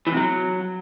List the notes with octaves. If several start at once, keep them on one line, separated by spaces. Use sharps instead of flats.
E3
C3
F#3